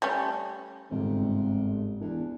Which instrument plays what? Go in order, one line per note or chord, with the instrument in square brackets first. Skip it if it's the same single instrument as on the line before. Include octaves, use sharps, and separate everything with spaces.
[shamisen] G3 A3 C#4
[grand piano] G1 G#2 [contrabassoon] C3
[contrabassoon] E2 [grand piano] D4